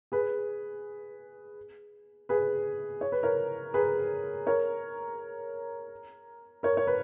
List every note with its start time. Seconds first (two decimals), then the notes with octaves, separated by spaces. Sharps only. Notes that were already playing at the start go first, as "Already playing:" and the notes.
0.12 G#4 B4
2.29 G#4 B4
3.01 C#5
3.12 B4
3.23 A#4 C#5
3.74 G#4 B4
4.47 A#4 C#5
6.63 A#4 C#5
6.77 C#5
6.87 B4